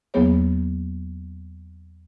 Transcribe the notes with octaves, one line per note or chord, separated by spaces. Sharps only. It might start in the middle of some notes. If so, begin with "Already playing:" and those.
E2 F#3 A#3 B3 G#4 C#5